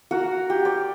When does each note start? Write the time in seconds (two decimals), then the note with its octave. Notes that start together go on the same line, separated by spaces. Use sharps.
0.11 F#4 A#4 F#5
0.50 G4
0.65 D5